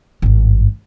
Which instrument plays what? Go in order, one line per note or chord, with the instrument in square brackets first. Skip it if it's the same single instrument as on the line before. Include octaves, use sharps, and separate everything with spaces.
[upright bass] G#1 G2